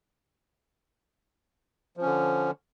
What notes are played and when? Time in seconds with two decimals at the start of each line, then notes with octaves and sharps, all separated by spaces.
1.97 F3
2.01 C#4
2.06 D3